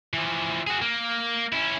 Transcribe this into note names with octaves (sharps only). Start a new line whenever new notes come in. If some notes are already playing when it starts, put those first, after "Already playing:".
E3 F3
F#4 G#4
A#3
C#4 E4